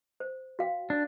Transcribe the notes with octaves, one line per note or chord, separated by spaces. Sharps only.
C5
F#4 F5 G5
D4